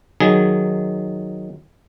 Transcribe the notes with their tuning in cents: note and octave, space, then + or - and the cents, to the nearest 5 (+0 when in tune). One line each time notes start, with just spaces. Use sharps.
D#3 +0 F#3 +0 G#4 +0